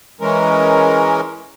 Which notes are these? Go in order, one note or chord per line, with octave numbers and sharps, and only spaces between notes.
E3 G#3 C#4 A#4